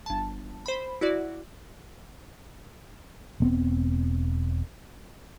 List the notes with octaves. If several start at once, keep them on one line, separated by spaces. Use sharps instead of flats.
G1 A5
C5 B5
E4 F#4 D5
E1 B3 C4